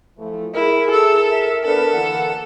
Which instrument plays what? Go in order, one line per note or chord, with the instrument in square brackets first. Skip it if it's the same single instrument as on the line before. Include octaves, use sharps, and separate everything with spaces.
[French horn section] E3 F3 A3
[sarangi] E4 [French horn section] G#4 [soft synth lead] A#4
[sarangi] A4 [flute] E6
[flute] E5
[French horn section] B3 D4 [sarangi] A4 [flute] B4
[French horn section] D3 E3 A#3 [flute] F#5